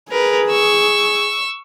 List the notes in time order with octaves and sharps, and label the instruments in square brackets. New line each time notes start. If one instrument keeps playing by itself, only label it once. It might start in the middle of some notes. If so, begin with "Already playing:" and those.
[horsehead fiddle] G#4 [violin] A#4 B4
[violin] C#6 E6